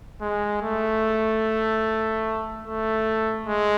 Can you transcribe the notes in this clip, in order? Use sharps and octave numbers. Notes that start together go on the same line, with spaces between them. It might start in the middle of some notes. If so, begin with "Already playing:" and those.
G#3
A3
A3
G#3